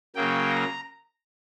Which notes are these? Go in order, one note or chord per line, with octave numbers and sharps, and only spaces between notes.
C#3 F#3 A#3 G5
A#5